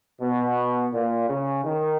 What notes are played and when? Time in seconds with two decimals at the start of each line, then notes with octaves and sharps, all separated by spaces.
0.21 B2
0.93 A#2
1.29 C#3
1.64 D#3